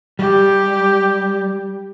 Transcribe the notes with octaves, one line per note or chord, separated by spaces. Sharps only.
G3 G4